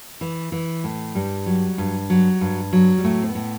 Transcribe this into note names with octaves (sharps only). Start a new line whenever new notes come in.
E3
E3
A2
G2 G3
F#3
G2
F#3
G2
F#3
G3
A2 A3
C4
B3
A2